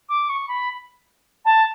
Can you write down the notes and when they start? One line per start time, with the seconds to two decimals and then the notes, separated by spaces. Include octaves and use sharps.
0.09 D6
0.29 C#6
0.48 B5
1.45 A5